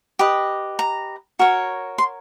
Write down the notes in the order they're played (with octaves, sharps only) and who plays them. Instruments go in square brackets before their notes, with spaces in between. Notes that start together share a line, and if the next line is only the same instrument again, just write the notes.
[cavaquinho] G4 B4 D#5
A#5
F#4 A#4 C#5
C6